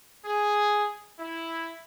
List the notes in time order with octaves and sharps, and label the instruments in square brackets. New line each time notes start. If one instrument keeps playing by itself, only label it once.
[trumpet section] G#4
E4